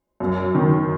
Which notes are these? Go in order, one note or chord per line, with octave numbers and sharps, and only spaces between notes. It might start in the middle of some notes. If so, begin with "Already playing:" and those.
F#2
D#3